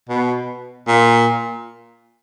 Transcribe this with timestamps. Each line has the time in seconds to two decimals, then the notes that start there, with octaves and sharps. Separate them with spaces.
0.09 B2
0.88 A#2